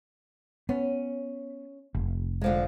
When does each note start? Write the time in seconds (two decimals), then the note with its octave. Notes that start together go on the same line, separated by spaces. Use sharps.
0.69 B3 C#4
1.94 F1
2.41 D3 F3 G#3